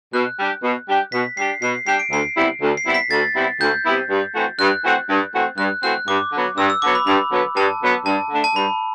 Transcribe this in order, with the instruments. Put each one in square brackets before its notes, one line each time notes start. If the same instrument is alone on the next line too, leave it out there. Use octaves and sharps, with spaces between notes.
[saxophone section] B2 [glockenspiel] F#6
[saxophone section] G3 D4 G4
B2
G3 D4 G4
[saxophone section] B2 [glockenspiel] B6
[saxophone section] G3 D4 G4 [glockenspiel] C7
[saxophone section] B2 [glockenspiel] C7
[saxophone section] G3 D4 G4 [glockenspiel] C7
[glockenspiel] D7
[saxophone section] D2 [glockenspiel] C7
[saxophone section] C3 G3 B3 E4
D2
[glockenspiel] C7
[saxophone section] C3 G3 B3 E4
[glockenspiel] B6
[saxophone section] D2 [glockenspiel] A6
[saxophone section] C3 G3 B3 E4
[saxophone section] D2 [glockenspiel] G6
[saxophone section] C3 G3 B3 E4
G2
E3 A3 C4 F#4
[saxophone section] G2 [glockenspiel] F#6
[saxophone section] E3 A3 C4 F#4
G2
E3 A3 C4 F#4
[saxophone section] G2 [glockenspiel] F#6
[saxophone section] E3 A3 C4 F#4 [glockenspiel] F#6
[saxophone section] G2 [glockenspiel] D6
[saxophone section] D3 F#3 B3
[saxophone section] G2 [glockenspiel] E6
[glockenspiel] E6
[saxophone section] D3 F#3 B3 [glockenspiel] D6
[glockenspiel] B5
[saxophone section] G2 [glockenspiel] B5
[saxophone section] D3 F#3 B3
[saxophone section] G2 [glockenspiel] A5
[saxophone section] D3 F#3 B3
[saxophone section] G2 [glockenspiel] A5
[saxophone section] D3 A3 D4
[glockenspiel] A5
[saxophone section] G2 [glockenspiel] B5